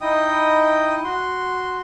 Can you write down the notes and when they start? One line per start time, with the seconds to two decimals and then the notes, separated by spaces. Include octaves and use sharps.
0.01 D#4 E4 D#5 G5 D#6
1.04 F#4 C6